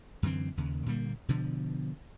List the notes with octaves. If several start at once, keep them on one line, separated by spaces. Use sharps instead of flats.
F#2 D3 E3 C4
D#2 C#3
A#2 D3 G3 A#3
B2 D3 F3